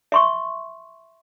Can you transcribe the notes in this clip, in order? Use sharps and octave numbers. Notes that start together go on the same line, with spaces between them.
E5 C6 C#6